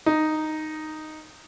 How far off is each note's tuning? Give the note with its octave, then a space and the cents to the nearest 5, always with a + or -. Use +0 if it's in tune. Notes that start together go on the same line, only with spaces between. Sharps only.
D#4 -5